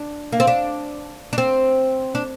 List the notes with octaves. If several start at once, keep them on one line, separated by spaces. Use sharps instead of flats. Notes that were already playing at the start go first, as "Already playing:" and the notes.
Already playing: D4
A#3
C4
D4
D4
C4
D4